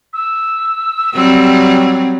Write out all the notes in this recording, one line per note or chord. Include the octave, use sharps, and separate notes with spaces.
E6
F#3 G3 C4